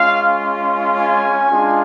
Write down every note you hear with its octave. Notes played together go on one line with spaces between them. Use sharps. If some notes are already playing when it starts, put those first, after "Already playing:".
Already playing: G#3 C#4 F4 F5
G#5
G#3 D4 F4